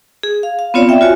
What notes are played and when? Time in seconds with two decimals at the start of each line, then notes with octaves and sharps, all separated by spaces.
0.23 G#4
0.43 F5
0.59 F5
0.74 B3 C4 F4 C#5 D5 F5
0.89 E5 G5
1.01 F4 F#4 C#5 G#5